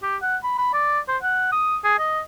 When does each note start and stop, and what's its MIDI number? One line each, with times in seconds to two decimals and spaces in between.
0.02 0.17 67
0.22 0.36 78
0.43 0.53 83
0.58 0.73 83
0.73 1.00 74
1.08 1.17 72
1.23 1.48 78
1.52 1.77 87
1.84 1.96 68
1.99 2.21 75